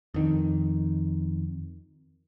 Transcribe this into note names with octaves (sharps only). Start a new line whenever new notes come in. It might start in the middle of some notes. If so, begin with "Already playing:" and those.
F2 D#3